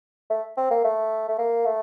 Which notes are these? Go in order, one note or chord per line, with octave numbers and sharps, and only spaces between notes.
A3
C4
A#3
A3
A3
A#3
A3